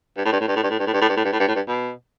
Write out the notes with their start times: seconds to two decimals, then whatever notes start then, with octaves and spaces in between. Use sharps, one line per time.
0.18 G2
0.25 A2
0.33 G2
0.41 A2
0.48 G2
0.56 A2
0.63 G2
0.71 A2
0.79 G2
0.87 A2
0.94 G2
1.01 A2
1.09 G2
1.17 A2
1.25 G2
1.33 A2
1.40 G2
1.48 A2
1.56 G2
1.68 B2